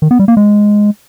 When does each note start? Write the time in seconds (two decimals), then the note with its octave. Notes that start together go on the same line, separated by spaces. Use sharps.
0.02 D#3
0.11 B3
0.19 G3
0.28 A#3
0.37 G#3